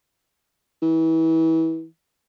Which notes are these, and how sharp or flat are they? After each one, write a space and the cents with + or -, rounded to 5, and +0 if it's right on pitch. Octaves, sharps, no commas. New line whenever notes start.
E3 -30